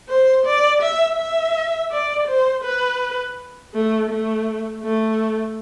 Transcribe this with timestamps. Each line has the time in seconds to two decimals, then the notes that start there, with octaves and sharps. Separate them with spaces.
0.09 C5
0.46 D5
0.82 E5
1.19 E5
1.91 D5
2.28 C5
2.64 B4
3.74 A3
4.10 A3
4.84 A3